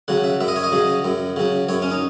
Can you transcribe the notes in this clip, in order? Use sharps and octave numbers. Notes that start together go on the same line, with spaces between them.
C#3 F#3 F#5
E5
F#2 E5
D#5
C#5
D#5
C#3 F#3
F#2
C#3 F#3
F#2 C#5
C#4
D#4